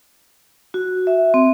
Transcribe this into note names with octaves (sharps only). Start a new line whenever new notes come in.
F#4
E5
C4